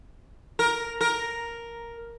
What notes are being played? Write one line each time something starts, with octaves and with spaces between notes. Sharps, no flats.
A#4
A#4